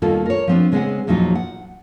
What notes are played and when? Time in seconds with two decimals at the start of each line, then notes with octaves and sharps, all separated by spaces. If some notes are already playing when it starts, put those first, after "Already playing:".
0.02 D#2 B2 G3 A#3 F4 A4
0.26 A#4 C#5
0.47 F3 B3 C4 D4 F4
0.72 C#3 G#3 B3 C4 B4 F#5
1.07 E2 A#2 F3 F#3 D#4
1.35 F#5